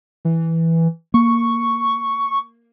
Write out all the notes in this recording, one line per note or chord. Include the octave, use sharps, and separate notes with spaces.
E3
A#3 C#6